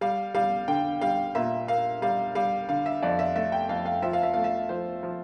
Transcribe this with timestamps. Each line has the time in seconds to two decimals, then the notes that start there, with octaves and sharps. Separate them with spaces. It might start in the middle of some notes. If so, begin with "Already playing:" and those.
0.01 G3 F5
0.34 G3 F5
0.68 D3 G5
1.01 G3 F5
1.35 A#2 E5
1.68 A#3 F5
2.02 G3 F5
2.35 G3 F5
2.69 D3 F5
2.86 E5
3.02 F2 D5
3.19 E5
3.36 A3 E5
3.52 G5
3.69 F2 F5
3.86 F5
4.02 F3 E5
4.13 F5
4.23 E5
4.34 A3 F5
4.44 E5
4.69 F3 C5
5.03 F3